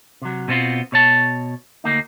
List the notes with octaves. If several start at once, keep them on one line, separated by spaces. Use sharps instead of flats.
C3 F#3
B2 B3 C4 F4
B2 C#5 A5
D2 A#3 D#4